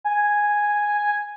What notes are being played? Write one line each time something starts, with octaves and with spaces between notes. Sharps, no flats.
G#5